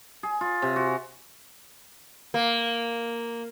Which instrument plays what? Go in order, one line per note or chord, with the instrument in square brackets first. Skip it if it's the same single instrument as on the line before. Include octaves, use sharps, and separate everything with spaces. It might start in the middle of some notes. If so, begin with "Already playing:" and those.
[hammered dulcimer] G#4
F4
C3
F#4
[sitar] A#3